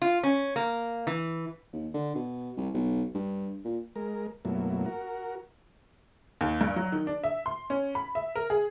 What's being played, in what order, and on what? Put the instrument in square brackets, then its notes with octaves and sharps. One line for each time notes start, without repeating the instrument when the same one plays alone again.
[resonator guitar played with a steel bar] F4
C#4
A#3
E3
[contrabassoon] D#2
D3
B2
C2
B1
G2
A#2
[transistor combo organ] G#3 A#4
F#2 B2 F#3 A3 A#3 E4
F#4 A#4
[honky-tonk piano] D#2
G2
F#3
D#3
D4
E5
C6
C#4
B5
E5
A#4
G#4